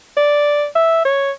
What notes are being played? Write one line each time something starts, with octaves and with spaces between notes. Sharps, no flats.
D5
E5
C#5